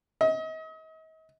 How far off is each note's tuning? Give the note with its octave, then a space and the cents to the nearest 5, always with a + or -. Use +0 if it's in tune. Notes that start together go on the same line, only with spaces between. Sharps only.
D#5 +40